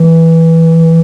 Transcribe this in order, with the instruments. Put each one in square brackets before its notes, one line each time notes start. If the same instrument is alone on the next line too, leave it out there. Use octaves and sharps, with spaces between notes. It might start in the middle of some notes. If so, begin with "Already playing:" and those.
Already playing: [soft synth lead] E3